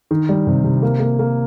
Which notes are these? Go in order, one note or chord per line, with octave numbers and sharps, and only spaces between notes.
D#3
G3
C3
C3
A#3
A#3
A#3